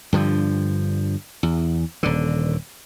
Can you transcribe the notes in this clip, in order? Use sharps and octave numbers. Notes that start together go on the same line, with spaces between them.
G2 D3 F3
E2
D#1 D3